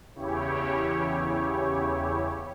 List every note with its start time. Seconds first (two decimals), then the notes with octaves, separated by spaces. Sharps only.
0.14 E2 C#3 E4 G4 C#5